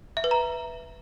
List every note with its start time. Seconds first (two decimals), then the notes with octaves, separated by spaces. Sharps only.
0.17 E5
0.24 B4
0.31 A#5